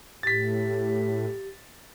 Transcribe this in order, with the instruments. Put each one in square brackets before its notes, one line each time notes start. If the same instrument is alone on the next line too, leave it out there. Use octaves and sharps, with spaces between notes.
[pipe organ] A2 [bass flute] G4 [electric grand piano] A6 B6